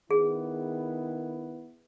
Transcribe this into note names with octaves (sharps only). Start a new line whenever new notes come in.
D#3 B3 E4 G#4